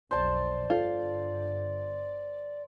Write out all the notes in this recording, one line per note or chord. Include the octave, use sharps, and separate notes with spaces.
B1 F2 C5 D5 A5
G1 D3 F4 A4